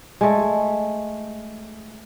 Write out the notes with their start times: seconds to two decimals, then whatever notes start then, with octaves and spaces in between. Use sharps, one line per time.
0.21 G#3 A3